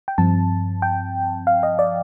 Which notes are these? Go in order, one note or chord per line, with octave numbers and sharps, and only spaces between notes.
G5
G2 F3 C4 A5
G5
F5
D#5
D5